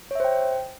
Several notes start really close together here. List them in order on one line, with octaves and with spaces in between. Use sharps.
C#5 E5 C5 G5